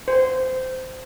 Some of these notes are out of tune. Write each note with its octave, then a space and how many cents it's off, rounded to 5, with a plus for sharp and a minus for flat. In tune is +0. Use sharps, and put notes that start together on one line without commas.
C5 -15